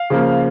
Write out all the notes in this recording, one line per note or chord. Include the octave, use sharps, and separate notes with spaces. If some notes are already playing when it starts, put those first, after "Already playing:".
Already playing: F5
C#3 F3 A#3